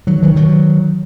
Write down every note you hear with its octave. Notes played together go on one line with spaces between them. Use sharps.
D#3 F#3
D#3 F#3
D#3 F#3